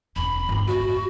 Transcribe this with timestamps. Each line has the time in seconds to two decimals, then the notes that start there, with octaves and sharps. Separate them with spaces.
0.16 E1 F2 B5
0.49 G1 F2
0.67 A2 F#4